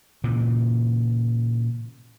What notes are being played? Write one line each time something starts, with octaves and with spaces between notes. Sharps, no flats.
A#2 C#3 E3